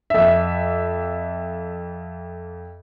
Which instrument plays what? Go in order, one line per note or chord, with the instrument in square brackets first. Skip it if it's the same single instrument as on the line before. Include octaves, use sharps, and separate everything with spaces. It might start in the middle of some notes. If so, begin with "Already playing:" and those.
[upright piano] F2 E5